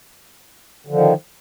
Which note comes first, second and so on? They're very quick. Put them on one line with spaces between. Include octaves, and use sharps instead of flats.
D3 F3 D#3